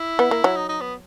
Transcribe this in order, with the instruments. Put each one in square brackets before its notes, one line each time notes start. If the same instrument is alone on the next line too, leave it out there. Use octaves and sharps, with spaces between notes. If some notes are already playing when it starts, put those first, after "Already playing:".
Already playing: [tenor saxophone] E4
[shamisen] B3
A#3
F#3
[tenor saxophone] D#4
D#4
B3